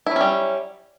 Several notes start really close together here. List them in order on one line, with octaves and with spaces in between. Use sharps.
E4 F#3 C#4 G3